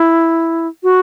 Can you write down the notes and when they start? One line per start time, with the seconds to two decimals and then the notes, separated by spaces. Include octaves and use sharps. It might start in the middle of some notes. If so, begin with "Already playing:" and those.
Already playing: E4
0.83 F#4